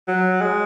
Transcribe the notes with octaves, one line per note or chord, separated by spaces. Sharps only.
F#3
G#3